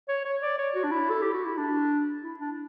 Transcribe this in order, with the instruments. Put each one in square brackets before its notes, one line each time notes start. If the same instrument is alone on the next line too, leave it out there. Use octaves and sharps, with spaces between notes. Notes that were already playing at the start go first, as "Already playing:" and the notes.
[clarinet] C#5
C#5
D5
C#5
F#4
D4
E4
A4
G4
F#4
E4
D4
E4
D4